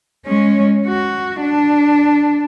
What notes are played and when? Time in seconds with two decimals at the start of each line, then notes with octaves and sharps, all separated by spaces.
0.26 G#3 C#4
0.87 F#4
1.42 D4